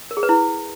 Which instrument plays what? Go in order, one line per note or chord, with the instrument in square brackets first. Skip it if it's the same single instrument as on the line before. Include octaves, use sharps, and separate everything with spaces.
[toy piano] A#4
G#4
B4
E4